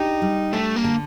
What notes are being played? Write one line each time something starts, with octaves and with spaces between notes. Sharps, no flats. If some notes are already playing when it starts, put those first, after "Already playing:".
Already playing: D4 D#4 G4
G3
A3 D4
A#3
D3